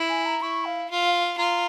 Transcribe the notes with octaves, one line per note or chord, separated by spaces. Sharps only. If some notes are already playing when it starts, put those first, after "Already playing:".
Already playing: E4
G#5
A#5
E4 C#6
F5
F4
F5
F4 A#5